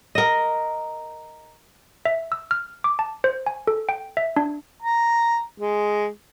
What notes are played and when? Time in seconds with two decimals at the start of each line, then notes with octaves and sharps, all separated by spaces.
0.15 A#4 D#5
2.05 E5
2.32 E6
2.51 F6
2.84 D6
2.99 A5
3.24 C5
3.47 G#5
3.67 A4
3.89 G5
4.17 E5
4.36 D4
4.82 A#5
5.60 G#3